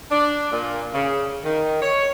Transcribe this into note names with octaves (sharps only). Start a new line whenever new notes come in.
D4
A#2
C#3
D#3
C#5